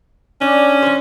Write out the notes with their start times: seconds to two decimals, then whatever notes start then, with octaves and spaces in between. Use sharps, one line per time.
0.41 C#4 D4
0.82 E3 C5